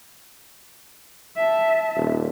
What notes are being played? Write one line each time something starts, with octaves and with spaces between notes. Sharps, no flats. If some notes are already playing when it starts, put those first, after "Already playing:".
E5 A5
D#1